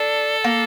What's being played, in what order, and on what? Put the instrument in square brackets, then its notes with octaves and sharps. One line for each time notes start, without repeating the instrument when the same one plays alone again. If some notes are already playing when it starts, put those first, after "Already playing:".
Already playing: [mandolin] D4 [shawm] A4
[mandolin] A#3